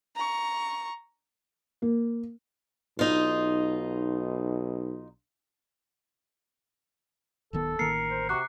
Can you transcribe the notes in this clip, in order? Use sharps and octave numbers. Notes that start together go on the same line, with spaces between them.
A#5 C#6
A#3
B1 D#4 F4
D1 D#3 B3 A4
A1 D#3 A#3 A#4 C7 C#7
C5
C3 F#4 A#5 D6 F#6